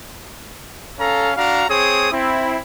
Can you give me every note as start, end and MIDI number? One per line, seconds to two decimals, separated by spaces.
0.99 1.32 61
0.99 1.32 69
0.99 1.32 77
0.99 1.32 82
1.37 1.65 62
1.37 1.65 66
1.37 1.65 77
1.37 1.65 82
1.68 2.11 60
1.68 2.11 68
1.68 2.11 73
1.68 2.11 87
2.12 2.60 60
2.12 2.60 64